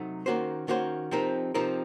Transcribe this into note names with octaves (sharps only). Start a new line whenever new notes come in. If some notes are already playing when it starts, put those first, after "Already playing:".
Already playing: C3 F#3 A3 D#4
D#3 A#3 C#4 F#4 C5
D#3 A#3 C#4 F#4 C5
C3 F3 C4 D#4 A#4
C3 F3 C4 D#4 A#4